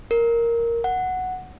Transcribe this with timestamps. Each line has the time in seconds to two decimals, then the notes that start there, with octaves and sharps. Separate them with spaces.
0.11 A#4
0.84 F#5